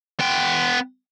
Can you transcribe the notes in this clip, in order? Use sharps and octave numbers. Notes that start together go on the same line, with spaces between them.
B3 G5